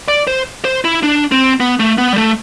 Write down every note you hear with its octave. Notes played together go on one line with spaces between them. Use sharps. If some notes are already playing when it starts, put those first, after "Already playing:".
D5
C5
C5
E4
D4
C4
B3
A3
B3
G3
A3